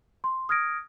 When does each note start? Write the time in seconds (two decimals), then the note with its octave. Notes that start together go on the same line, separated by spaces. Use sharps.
0.24 C6
0.49 D#6 F6 G#6 A#6 D7